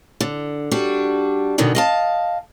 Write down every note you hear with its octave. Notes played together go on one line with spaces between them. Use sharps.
D3
G3 D4 F#4
G#2 B2 D3 D#3 D4
D#5 F5 A5